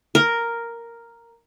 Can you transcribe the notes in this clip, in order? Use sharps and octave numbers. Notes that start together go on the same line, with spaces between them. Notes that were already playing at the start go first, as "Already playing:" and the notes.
A#4